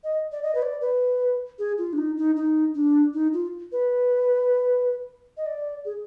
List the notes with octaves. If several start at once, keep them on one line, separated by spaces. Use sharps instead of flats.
D#5
D5
D#5
B4
D5
B4
G#4
F4
D4
D#4
D#4
D#4
D4
D#4
F4
B4
D#5
D5
G#4